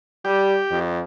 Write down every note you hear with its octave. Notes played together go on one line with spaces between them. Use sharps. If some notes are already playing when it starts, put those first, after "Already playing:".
G3 G4
F2